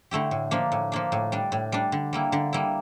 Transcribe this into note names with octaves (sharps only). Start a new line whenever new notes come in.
D3 A3 E4 G4
A2
F3 A#3 D4
A2
F3 A#3 D4
A2
G3 D4
A2
G3 D4
D3
G3 A#3 E4
D3
G3 A#3 E4